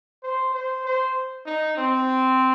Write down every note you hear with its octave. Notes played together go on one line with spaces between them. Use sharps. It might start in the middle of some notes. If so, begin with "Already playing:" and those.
C5
C5
C5
D#4
C4